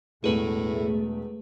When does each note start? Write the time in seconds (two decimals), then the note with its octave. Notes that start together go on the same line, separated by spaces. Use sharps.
0.24 E1 E2 A2 A3 G#4 B4